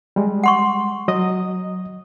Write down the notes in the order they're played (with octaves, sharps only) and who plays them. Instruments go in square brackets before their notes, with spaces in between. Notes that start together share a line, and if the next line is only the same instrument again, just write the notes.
[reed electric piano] G3 G#3
[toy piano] F#5 C6 C#6
[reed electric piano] F#3 D#5 D#6